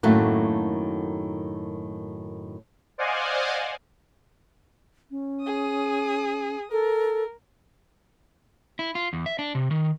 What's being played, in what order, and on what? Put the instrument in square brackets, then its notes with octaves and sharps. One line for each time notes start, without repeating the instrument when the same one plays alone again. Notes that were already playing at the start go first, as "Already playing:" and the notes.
[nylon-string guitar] F#2 A2 D#3 A3 A#3 F#4
[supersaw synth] C5 D5 D#5 F5 F#5 G#5
[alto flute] C#4
[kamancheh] G#4 D#6
[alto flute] A4 [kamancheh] A#4
[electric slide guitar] E4
F4
E2
E5
D4
C3
D#3